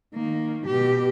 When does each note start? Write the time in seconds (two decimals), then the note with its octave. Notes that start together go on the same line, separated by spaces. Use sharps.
0.14 D#3 A#3
0.67 B2 G4